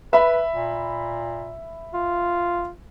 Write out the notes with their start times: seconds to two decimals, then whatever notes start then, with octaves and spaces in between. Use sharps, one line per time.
0.13 B4 E5 B5
0.51 A#2
1.94 F4